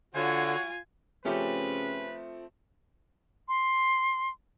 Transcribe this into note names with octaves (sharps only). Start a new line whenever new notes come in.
D3 F4 F#4 C#5 G#5
C#3 F3 A3 C4 C#4 G4 B4
C6